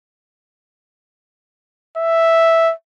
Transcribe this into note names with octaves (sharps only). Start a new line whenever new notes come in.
E5